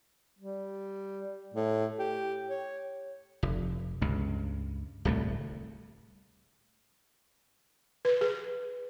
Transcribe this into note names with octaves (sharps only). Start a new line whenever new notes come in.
G3
A2
G4
C#5
F1
C#2 G2
D1 C2 A3
B4
G#4